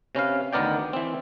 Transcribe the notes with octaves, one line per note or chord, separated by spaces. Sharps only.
C3 C#4 B4 F5
D2 D#3 B3 A#4 D5 G5
E3 C4